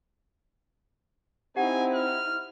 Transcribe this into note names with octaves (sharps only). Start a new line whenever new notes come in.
C4 D#4 E4 G4 F#5 G#5
F6